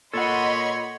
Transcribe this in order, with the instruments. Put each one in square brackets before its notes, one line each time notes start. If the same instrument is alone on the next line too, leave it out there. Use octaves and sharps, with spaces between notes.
[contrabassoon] A#2 [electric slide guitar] A4 F#5 [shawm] C#5 [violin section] D#5 B5 C6